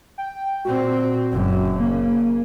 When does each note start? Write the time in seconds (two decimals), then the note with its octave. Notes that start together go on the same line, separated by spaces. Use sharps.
0.18 G5
0.65 A#2 C4 F#4
1.32 F#1 F#2
1.79 C#3 A#3